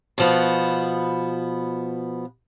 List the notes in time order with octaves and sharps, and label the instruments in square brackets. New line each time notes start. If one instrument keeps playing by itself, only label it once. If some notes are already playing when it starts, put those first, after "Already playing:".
[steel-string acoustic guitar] B2 F3 B3